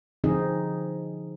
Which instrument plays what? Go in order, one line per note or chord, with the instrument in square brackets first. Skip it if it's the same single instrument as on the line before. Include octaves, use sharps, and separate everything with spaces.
[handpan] D3 F3 C4 D#4 G#4 D#5